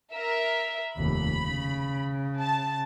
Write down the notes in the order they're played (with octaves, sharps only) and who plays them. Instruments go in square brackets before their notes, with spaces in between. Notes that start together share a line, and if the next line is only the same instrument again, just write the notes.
[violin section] A#4 E5
[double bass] F1 D#2 [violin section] B5
[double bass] C#3
[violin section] A5